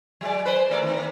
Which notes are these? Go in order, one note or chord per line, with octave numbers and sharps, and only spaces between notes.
F#3 G#3 D5
B4 C5
A3 A#4 D5
D#3 C4
A#3